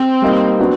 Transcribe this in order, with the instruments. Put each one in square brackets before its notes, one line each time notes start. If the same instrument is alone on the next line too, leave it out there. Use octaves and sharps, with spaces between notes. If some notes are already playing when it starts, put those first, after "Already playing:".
Already playing: [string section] C4
[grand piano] G3 A#3 D#4
F#3 B3 D4 F#4